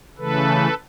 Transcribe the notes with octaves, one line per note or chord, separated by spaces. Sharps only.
C#3 E3 A3 A4 B4